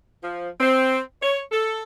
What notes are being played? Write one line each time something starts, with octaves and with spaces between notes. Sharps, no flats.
F3
C4
C#5
A4